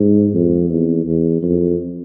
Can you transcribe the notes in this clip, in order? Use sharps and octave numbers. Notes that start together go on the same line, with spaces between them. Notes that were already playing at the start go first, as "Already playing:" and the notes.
Already playing: G#2
F2
E2
E2
F2